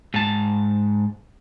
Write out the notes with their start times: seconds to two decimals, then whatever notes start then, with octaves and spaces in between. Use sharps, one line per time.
0.14 G#2 A5